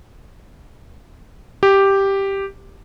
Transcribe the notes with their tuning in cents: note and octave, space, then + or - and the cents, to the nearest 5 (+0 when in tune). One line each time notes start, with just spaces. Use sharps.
G4 +0